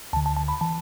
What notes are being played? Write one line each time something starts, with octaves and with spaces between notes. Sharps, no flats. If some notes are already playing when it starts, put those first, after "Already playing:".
D2 D3 A5
A5
A5
B5
E3 A5